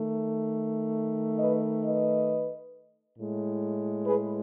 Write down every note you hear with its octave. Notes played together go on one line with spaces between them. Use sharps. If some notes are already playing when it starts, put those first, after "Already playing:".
Already playing: D#3 A3
B4 D#5
B4 D#5
A2 G#3
G#4 B4